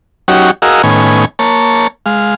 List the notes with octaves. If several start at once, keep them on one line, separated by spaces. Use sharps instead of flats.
F#3 C#4 D#4 F#4 G4
F#4 G#4 A#4 D#5 F5 E6
A2 D#3 B3 C#4 G#5
A#3 C#5 A5
G#3 F5